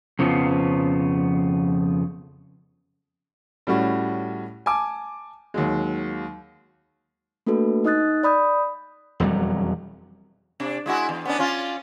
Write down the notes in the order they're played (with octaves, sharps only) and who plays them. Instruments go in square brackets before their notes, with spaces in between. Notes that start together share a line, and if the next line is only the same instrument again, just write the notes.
[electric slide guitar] F2 C#3 F3 B3
[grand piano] A2 G3 C#4 F#4
G#5 A5 D6
D#2 F#3 G#3
[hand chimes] A3 A#3 D4 F#4 A4 B4
D#4 D#5 D#6 F#6 A6
D5 B5 D#6 G6
[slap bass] E1 F2 F#3 G3
[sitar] C3 D4
G#3 E4 F#4
E2
B3 C#4 D4
C#4 D4 F4